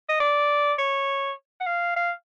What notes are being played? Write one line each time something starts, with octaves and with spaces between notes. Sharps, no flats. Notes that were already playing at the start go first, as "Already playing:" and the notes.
D#5
D5
C#5
F#5
F5
F5